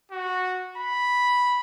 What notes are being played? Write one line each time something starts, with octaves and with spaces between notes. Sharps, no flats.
F#4
B5